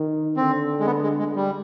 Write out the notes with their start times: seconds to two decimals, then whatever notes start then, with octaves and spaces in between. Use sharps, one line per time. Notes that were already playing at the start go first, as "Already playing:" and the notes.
Already playing: D#3
0.37 D3 C4
0.80 G#3
0.86 B3
1.03 G#3
1.19 G#3
1.36 G3